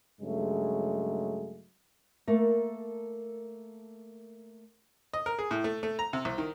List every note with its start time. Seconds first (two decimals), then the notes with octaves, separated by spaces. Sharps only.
0.21 G2 C#3 F#3 G#3 A3
2.27 A3 A#3 A4 A#4
5.14 D#5
5.26 A#4
5.39 G#4
5.51 A2
5.64 A3
5.83 A3
5.99 A#5
6.13 C3
6.25 C2
6.38 D#3